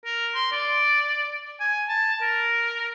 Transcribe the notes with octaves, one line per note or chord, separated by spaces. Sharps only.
A#4
C6
D5
G#5
A5
A#4